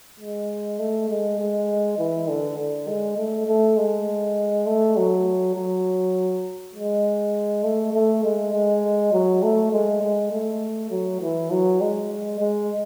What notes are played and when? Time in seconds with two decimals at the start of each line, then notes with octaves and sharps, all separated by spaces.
0.20 G#3
0.79 A3
1.09 G#3
1.39 G#3
1.99 E3
2.28 D3
2.58 D3
2.88 G#3
3.17 A3
3.47 A3
3.77 G#3
4.66 A3
4.97 F#3
5.55 F#3
6.75 G#3
7.64 A3
7.93 A3
8.24 G#3
8.53 G#3
9.12 F#3
9.43 A3
9.72 G#3
10.02 G#3
10.32 A3
10.91 F#3
11.21 E3
11.51 F#3
11.81 G#3
12.40 G#3